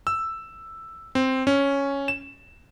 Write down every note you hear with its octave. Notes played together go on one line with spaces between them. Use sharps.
E6
C4
C#4
E7